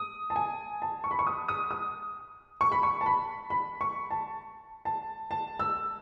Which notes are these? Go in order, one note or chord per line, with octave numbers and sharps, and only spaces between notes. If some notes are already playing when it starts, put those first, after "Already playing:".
Already playing: D#6
A5
G#5
A5
C#6
B5
C#6
D#6
D#6
D#6
C#6
B5
C#6
A5
B5
B5
C#6
A5
A5
A5
E6